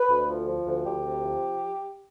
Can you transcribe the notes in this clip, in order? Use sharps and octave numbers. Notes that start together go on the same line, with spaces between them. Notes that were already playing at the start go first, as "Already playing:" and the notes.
Already playing: B4
D2
F3
F3
D2
D2 G4
C3
F3